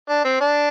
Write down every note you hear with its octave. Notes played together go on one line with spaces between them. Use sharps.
D4
C4
D4